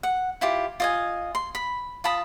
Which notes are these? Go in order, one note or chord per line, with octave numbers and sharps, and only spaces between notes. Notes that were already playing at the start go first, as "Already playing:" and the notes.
F#5
E4 F4 G4
F4 D#5 G#5
C6
B5
F4 A5 B5 D#6